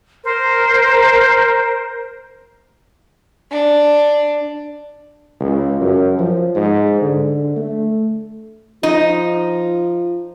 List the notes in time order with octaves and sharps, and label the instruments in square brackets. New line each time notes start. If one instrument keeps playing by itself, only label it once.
[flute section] A#4 C5
[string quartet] D4
[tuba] C#2
F#2
F3
G#2
D3
A3
[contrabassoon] F3 [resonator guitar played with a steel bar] D#4